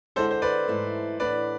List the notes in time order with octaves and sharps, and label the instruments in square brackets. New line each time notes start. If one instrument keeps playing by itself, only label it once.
[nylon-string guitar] D3 G#3 B3 E4 [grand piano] A4 C5
[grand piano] C5
B4 D5
[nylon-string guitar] G#2 E3 A3 E4
[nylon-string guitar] A2 E3 B3 D4 [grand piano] B4 D5